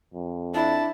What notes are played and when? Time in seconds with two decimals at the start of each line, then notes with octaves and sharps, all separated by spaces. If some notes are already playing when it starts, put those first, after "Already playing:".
0.14 F2
0.54 D4 E4 A5